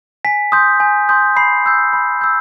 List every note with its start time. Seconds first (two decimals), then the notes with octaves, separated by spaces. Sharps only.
0.25 G#5 B6
0.52 C6 D#6 G6
0.80 G#5
1.09 C6 D#6 G6
1.36 B5 C7
1.66 E6 G6
1.93 B5
2.21 E6 G6